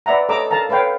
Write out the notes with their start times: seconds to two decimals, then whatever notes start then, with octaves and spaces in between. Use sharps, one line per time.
0.06 B4 D5 E5 F#5 A#5
0.29 A4 C#5 D#5 A#5 D6 E6
0.51 A4 A#4 F5 A5 A#5
0.69 A4 B4 C#5 F5 G5